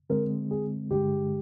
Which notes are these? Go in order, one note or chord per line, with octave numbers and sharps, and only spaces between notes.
D3 G#3 C4 A#4
G#4
G2 D3 G#3 G4